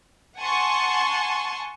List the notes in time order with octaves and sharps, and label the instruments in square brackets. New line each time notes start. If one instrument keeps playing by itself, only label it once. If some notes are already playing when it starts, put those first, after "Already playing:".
[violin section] F#5 G#5 A5 C6 C#6